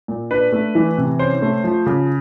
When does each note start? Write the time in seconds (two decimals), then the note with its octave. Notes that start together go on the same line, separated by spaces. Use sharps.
0.08 A#2
0.31 D4 B4
0.52 A3
0.75 E3
0.98 C3
1.19 C#4 C5
1.42 A3
1.64 F3
1.86 C#3